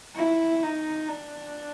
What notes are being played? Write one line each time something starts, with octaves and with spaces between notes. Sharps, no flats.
E4
D#4
D4